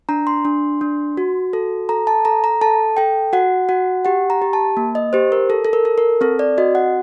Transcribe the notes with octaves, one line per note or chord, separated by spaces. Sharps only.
D4 A#5
C6
D4
D4
F#4
A4
A4 A#5
A5
A4 A#5
A#5
A4 A5
A4 G5
F#4 F#5
F#4 F#5
G4 F#5
A#5
G4
A5
A#3
D#5
G4 C5
A#4
A4
A4
A#4
A4
A#4
C4 A4
D5
F#4 D#5
F#5